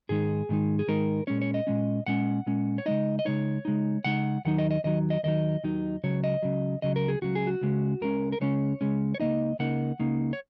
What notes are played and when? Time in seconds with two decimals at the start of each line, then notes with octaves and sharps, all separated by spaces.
0.09 G#2 D#3 G#3 D#4 G#4
0.49 G#2 D#3 G#3 D#4
0.79 G#4
0.88 G#2 D#3 G#3 D#4 A#4
1.27 A#2 G#3 C#4 C#5
1.42 C#5
1.54 D#5
1.67 A#2 G#3 C#4
2.06 A#2 G#3 C#4 F#5
2.46 A#2 G#3 C#4
2.78 C#5
2.86 C#3 G#3 D#4 D#5
3.19 D#5
3.25 C#3 G#3 D#4 C#5
3.65 C#3 G#3 D#4
4.04 C#3 G#3 D#4 F#5
4.45 D#2 D#3 F#3 D#4 F#5
4.58 D#5
4.71 D#5
4.84 D#2 D#3 F#3 D#4 D#5
5.10 D#5
5.23 D#2 D#3 F#3 D#4 D#5
5.64 D#2 D#3 F#3 D#4
6.04 C#2 C#3 F#3 C#5
6.24 D#5
6.42 C#2 C#3 F#3
6.82 C#2 C#3 F#3 D#5
6.96 A#4
7.08 G#4
7.22 C#2 C#3 F#3 F#4
7.35 G#4
7.47 F#4
7.61 C#2 C#3 G#3 C#4
8.01 C#2 C#3 G#3 C#4 A#4
8.32 A#4
8.41 C#2 C#3 G#3 C#4 C#5
8.81 C#2 C#3 G#3 C#4
9.15 C#5
9.20 C#2 C#3 A#3 D#4 D#5
9.59 C#2 C#3 A#3 D#4 F#5
9.99 C#2 C#3 A#3 D#4
10.33 C#5